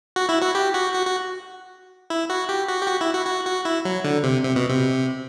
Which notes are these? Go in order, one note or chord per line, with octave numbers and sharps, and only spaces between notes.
F#4
E4
F#4
G4
F#4
F#4
F#4
E4
F#4
G4
F#4
G4
F#4
E4
F#4
F#4
F#4
E4
F#3
D3
C3
C3
B2
C3